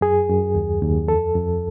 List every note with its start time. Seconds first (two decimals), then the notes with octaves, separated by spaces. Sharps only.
0.01 F#2 G#4
0.29 F#2
0.55 D#2
0.81 D#2
1.08 F2 A4
1.35 F2